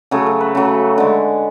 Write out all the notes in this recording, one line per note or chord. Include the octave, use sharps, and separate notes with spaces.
C#3 F#3 A3 G#4
A4
B4
C#3 F#3 A3
D3 G#3